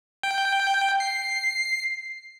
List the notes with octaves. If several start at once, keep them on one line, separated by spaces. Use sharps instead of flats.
G5
C7